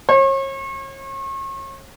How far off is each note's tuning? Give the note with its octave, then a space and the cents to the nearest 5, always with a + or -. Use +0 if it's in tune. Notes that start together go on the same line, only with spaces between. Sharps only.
C#5 -40